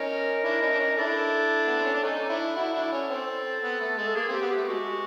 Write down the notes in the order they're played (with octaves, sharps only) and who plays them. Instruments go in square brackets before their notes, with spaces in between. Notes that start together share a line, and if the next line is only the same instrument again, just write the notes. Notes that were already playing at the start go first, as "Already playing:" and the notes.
Already playing: [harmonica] C#4 D#4 [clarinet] A#4
[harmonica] D4 E4
C#4 D#4
D4
C#4 D#4
[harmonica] D4 E4 [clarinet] A4
[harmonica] B3
C4
C#4
D4
[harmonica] C#4 D#4 [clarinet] A4
[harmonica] D4 E4
E4 F#4
D4 E4
C#4
C4
B3
A3
G#3
[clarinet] A4
[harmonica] A#3 [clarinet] G#4
[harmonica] C4 [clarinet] G4
[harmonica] B3
[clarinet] G4
[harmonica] A3
[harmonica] G#3 [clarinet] F#4